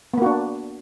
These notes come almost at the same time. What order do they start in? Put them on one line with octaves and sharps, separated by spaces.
B3 A#3 F#4 D4